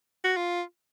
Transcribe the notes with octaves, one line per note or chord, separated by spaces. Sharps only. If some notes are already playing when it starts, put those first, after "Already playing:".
F#4
F4